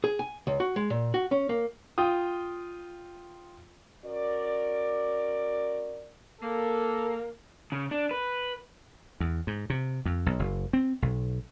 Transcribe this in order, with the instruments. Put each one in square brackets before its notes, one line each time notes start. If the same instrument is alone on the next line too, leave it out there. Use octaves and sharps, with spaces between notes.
[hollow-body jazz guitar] G#4
G#5
C#2
F#4
G#3
A#2
F#4
C#4
A#3
[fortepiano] F4 G5 D#6
[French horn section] C#4 F#4 A#4 D5
[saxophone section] A#3 [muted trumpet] A4
[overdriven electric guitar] C#3
D4
B4
[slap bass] E2
G#2
C3
F2
B1
F#1
C4
B1